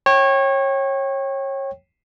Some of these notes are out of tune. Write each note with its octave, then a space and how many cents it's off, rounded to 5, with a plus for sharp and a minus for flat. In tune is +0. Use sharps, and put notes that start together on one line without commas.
C#5 -25 G5 -5